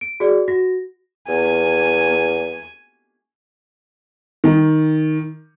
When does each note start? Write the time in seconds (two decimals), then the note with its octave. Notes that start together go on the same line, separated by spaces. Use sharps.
0.01 D7
0.20 F#4 G#4 D5
0.48 F#4 A#6
1.28 E2 G#5
4.44 D#3